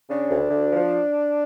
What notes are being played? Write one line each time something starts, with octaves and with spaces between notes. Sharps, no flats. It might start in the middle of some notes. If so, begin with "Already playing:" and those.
C#3 D4
D2
D2
F3